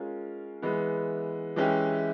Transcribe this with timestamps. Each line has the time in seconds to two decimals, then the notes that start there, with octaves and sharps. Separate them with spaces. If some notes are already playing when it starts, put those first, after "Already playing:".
Already playing: G#3 C#4 F4 A#4
0.62 E3 G#3 B3
1.56 E3 G#3 C#4 E4 G4